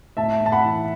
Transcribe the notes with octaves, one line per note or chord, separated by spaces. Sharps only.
A2 E5 A5
A2
A5
F#5 B5
E3